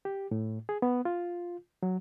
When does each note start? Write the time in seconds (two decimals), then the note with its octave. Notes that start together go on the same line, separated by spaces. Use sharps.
0.05 G4
0.31 A2
0.69 G#4
0.82 B3
1.05 F4
1.83 F#3